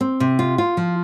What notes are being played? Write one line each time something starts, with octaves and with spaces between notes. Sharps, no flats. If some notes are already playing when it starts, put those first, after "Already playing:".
C4
C3
F4
F4
F3